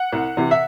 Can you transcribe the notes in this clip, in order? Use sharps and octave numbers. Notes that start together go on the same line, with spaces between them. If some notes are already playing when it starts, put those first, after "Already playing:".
Already playing: F#5
C2
C3 E3
E5